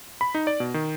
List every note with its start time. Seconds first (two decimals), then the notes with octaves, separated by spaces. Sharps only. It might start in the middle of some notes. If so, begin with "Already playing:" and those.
0.21 B5
0.35 D#4
0.47 D5
0.60 B2
0.74 D#3